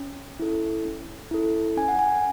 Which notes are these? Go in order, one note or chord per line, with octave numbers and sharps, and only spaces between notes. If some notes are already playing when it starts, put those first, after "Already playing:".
Already playing: C#4
E4 A4
C#4
E4 A4
C#4 G#5
F#5
G#5